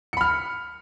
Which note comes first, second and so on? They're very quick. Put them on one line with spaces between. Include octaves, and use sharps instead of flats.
C#7 B5 F6